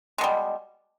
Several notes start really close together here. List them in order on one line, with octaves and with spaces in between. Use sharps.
G#3 B2 G3